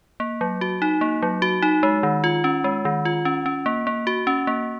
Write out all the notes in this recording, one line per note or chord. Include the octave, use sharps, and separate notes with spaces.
A#3
F#3
F#4
D#4
A#3
F#3
F#4
D#4
G#3
D#3
F4
C#4
G#3
D#3
F4
C#4
C#4
A#3
A#3
F#4
C#4
A#3